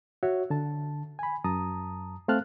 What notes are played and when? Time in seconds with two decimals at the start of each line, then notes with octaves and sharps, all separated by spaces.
0.23 F#4 C#5 E5
0.50 D3 A5
1.19 G#5 B5
1.44 F#2 A5 A#5 D#6
2.28 A3 C4 F5 A5 F6 F#6